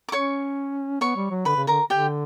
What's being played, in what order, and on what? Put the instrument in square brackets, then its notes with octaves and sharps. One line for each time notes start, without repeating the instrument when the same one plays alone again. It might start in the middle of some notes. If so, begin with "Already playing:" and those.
[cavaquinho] D6
[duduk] C#4 [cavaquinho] C#5 C#6
[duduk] B3 [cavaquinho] C#5 C#6
[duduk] G3
F#3
[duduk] D3 [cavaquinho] B4 B5
[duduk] C#3
[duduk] D3 [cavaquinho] A#4 A#5
[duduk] D3 [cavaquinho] G4 G5